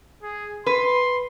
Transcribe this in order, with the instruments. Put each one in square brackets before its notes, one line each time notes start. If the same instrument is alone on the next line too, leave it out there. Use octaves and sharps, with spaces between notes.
[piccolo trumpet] G#4
[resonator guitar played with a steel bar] B4 [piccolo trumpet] C6